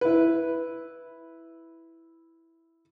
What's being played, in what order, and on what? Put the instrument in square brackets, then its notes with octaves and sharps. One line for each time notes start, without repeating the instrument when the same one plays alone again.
[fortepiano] E4 B4